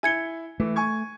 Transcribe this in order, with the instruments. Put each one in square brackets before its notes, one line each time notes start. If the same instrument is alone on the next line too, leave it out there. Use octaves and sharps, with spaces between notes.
[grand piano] E4 G7 [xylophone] G#5 G#6 C#7
[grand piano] E3 [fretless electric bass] A3
[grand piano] G#5 C#6 G#6